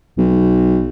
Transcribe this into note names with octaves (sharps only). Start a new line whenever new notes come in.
B1